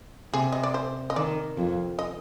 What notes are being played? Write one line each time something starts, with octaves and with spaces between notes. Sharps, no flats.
C3 G#4
D#5
D5
C5
D#5
D#3 D5
F2
D#5